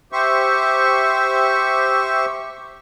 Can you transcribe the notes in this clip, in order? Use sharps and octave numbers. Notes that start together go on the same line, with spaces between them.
G4 C5 E5 C#6